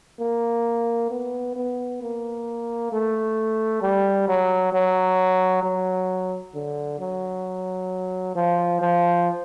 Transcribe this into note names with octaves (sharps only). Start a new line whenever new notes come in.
A#3
B3
B3
A#3
A3
G3
F#3
F#3
F#3
D3
F#3
F3
F3